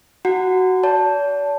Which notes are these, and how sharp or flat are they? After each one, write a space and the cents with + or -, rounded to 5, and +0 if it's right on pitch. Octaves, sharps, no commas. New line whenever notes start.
F#4 +5 F#5 +0 A#5 -30
D5 -45 A5 +0